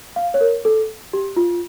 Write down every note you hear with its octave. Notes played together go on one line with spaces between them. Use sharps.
F5
C#5
A#4
A4
G4
F4